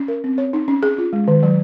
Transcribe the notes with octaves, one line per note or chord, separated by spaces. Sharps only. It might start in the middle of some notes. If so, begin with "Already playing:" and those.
Already playing: C#4
A#4
C4
C#5
D#4
C#4
G#4
F4
G#3
D#3
F#3